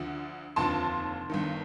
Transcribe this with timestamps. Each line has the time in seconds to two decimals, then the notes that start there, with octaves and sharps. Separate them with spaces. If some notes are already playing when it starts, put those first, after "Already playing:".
Already playing: D2 D3 F3
0.56 F1 D#2 D3 F3 A5 C6
1.30 G1 G2 D#3